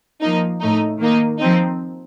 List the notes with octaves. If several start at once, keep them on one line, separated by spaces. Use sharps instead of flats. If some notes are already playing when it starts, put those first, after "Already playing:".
F3 A#3 D#4
A2 A3 D#4
D#3 A#3 D#4
F3 C4 D#4